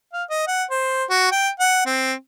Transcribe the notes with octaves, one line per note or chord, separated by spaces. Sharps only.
F5
D#5
F#5
C5
F#4
G5
F#5
C4